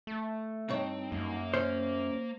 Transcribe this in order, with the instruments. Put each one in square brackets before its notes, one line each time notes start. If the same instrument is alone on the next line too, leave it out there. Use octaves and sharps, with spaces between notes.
[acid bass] A3
[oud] G2 D#4 C#5 [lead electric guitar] C4
[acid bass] F#2 [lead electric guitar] A#3 F5
[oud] C#4 [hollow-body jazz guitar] C5